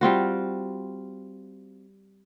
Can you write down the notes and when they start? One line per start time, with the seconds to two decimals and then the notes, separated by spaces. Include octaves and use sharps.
0.01 G3 C4 F4 F#4